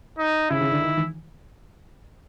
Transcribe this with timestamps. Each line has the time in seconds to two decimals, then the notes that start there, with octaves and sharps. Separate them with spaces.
0.18 D#4
0.50 C#3 E4
0.61 C#3
0.72 D3
0.82 D#3
0.97 E3